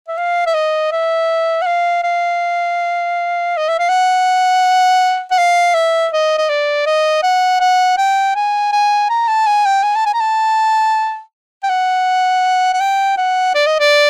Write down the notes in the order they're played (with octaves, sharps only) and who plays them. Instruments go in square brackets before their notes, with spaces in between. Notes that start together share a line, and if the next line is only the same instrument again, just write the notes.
[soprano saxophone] E5
F5
E5
D#5
E5
F#5
F5
F5
D#5
E5
F5
F#5
F#5
F5
E5
D#5
D#5
D5
D#5
F#5
F#5
G5
G#5
G#5
A#5
A5
G#5
G5
G#5
A5
G#5
A#5
A5
G5
F#5
F#5
G5
F#5
D5
D#5
D5